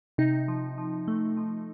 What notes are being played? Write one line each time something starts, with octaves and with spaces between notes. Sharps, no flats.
C3 D#4
F3
F3
A3
F3